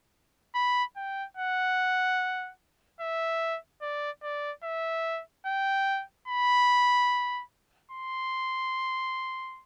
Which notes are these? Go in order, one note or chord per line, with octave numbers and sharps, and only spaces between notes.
B5
G5
F#5
E5
D5
D5
E5
G5
B5
C6